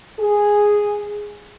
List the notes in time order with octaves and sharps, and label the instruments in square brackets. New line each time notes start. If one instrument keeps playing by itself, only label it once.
[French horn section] G#4